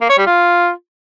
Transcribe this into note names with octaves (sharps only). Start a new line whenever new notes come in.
A#3
C#5
G3
F4